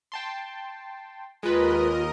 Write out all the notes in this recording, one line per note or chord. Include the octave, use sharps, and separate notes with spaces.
G5 A5 C6
D#2 G#3 F4 A#4 B4 D#5